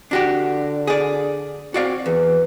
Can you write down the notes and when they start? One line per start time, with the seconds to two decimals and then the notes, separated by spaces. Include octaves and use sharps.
0.11 D3 D4 F#4 G4
0.87 G#4 D5
1.74 C4 F#4 D5 F5
2.06 E2 B4